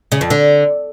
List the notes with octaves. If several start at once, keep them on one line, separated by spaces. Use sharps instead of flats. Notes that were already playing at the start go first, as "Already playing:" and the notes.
C#3
F2
D3